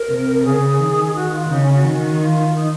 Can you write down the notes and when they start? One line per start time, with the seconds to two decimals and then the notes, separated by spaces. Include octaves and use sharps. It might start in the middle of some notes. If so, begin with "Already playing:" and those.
Already playing: A#4
0.09 C3
0.44 C#3 G#4
0.79 D#3
1.13 F#4
1.32 F4
1.49 C#3 D#4
1.61 C#4
1.73 F#4
1.84 D#3
2.20 F4
2.54 D#4